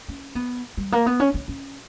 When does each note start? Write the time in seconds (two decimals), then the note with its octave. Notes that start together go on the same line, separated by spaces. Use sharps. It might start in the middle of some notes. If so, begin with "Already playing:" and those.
0.08 C#4
0.35 B3
0.77 G3
0.92 A#3
1.06 B3
1.20 C#4
1.34 C#4
1.48 C#4